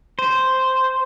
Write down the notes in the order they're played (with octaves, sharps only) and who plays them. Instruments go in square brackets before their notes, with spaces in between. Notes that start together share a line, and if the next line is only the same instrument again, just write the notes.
[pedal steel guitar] C5